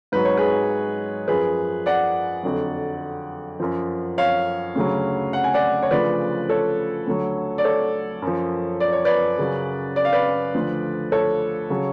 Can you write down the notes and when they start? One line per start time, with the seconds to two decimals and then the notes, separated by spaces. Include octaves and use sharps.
0.12 G#2 F#3 B4
0.25 C#5
0.37 G#4 B4
1.28 F#2 F3 G#4 B4
1.86 D5 F#5
2.43 F2 D3 F#3
3.60 F#2 F3
4.18 C#5 F5
4.76 D2 C#3 F#3
5.33 F#5
5.44 G#5
5.54 D5 F#5
5.83 C#5
5.91 D2 C#3 F3 B4 D5
6.49 A4 C#5
7.07 D2 D3 F#3
7.58 D5
7.64 A4 C#5
8.22 F#2
8.27 F3
8.80 D5
8.93 C#5
9.05 B4 D5
9.39 F#2 C#3 F#3
9.96 D5
10.05 F5
10.13 B4 D5
10.54 D2 D3 F3
11.12 A4 C#5
11.70 C#3 F#3